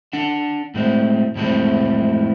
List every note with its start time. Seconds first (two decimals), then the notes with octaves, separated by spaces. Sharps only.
0.13 D4 F#5
0.75 A2 G#3 C4
1.35 F2 A2 E3 G#3 C4